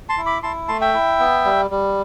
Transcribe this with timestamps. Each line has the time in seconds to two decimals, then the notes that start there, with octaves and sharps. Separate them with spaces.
0.09 A5 C6
0.18 E4
0.26 B5 D6
0.43 E4 A5 C6
0.68 A3 A5 C6
0.81 E5 G5
0.94 E4
1.20 B3
1.45 G3
1.70 G3